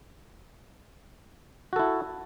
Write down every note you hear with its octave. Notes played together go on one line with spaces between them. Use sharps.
E4 F#4 A4